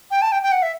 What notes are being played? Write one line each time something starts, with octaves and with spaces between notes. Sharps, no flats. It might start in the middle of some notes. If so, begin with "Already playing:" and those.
G5
A5
G5
G5
F#5
E5